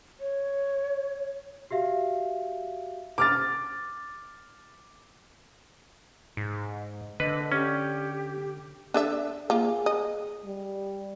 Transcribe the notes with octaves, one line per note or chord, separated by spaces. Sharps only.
C#5
F#4 G4 E5 F5
D6 F6 A6
G#2
D3 B4 D#5
C#4 G4
D4 A4 E5
A#3 F4 G#4
D#5
G3